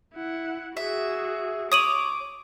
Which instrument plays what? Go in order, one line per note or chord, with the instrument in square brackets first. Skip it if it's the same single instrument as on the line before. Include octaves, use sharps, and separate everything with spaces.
[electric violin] E4 F#5
[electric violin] F#4 G#4 [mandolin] E5
[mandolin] C#5 [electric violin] D6 [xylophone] D#6 D#7 F#7